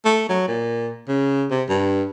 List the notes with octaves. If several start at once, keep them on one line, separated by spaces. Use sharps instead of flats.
A3
F#3
A#2
C#3
C3
G2